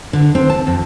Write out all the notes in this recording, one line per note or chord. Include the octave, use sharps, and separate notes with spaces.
D3
C4
A5
F2